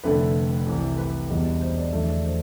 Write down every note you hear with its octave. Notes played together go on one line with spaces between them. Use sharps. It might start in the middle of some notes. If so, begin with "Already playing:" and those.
F1 F2 D3 A3 B4
C2 C3 E3
B4
E1 E2 B2 G3
C5
D5
E1 E2 D3 F3 A3 E5
D5
C5